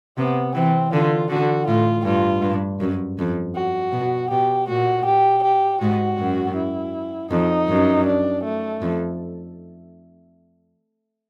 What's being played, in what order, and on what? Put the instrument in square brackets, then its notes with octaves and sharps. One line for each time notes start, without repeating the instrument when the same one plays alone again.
[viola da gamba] C3 [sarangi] B3
[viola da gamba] E3 [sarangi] C4
[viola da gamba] D3 [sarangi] F4
[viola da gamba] D3 [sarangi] F#4
[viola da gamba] A2 [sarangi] F4
[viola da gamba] G2 [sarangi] F4
[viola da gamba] G2
F#2
F2
[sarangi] F#4
[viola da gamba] B2
[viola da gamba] B2 [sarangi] G4
[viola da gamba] A#2 [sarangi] F#4
[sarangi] G4
G4
[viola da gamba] G#2 [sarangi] F#4
[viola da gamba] F#2
[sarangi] E4
[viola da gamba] F2 [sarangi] D#4
[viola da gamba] F#2
[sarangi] D4
A3
[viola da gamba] F2